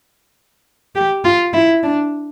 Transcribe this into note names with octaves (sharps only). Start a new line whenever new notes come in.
G4
F4
E4
D4